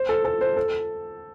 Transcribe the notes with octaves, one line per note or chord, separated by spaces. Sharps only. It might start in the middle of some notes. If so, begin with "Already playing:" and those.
Already playing: C5
A4
A4
C5
A4